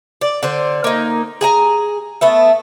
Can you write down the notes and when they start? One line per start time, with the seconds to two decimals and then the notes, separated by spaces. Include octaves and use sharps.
0.21 D5
0.43 D3 C5
0.84 A#3 D#4
1.41 G#4 G#5 A#5
2.21 A3 B3 E5